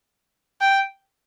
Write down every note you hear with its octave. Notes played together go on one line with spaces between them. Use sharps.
G5